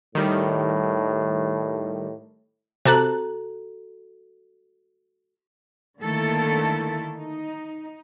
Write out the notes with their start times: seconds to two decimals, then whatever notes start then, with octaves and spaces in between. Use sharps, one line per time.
0.15 A2 D#3 G3
2.85 C3 F#4 A4 A5 A#5 F#6
6.00 D3 D#3 A3 A#3 E4 A4
7.15 D#4